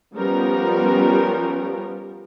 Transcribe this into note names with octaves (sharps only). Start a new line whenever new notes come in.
F3 G3 B3 C#4 A#4